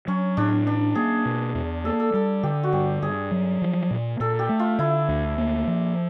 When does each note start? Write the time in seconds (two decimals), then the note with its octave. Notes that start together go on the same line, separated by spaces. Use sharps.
0.08 F#3 C#4
0.37 A2 D4
0.66 C#4 D4
0.95 A#3 G#4
1.25 B2
1.55 E2
1.84 A#3 A4
2.00 A4
2.14 G3 A4
2.43 D3 G4
2.63 F#4
2.73 G2 G4
3.02 G2 G#4
3.31 F#3
3.62 F3
3.91 A#2
4.20 A#2 A4
4.39 G4
4.49 A3
4.59 F4
4.79 D3 E4
5.08 D2
5.38 A#3
5.67 F3